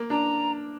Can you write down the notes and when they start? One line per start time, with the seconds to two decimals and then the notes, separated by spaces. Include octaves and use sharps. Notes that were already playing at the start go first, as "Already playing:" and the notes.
Already playing: A#3
0.10 D4 A#5